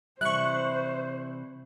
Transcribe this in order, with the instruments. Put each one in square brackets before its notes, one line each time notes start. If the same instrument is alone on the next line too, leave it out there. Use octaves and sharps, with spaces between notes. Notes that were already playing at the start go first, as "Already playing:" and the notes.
[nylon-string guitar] C3 E3 G3 [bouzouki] E4 [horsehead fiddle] C5 [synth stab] C#6 F#6